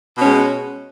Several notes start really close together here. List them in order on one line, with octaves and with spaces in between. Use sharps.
B2 C#4 G#3